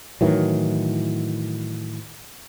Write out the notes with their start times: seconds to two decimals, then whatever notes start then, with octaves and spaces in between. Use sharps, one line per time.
0.21 A2 D#3 E3 F#3